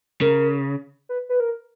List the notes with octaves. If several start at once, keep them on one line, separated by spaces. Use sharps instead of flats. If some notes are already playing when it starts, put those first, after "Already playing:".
C#3 A#4
B4
B4
A#4